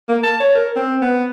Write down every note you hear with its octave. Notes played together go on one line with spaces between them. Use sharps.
A#3
A5
C#5
A#4
C4
B3